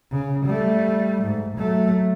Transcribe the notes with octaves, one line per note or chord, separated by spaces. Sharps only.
C#3
G3 A3
G#2
F#3 A3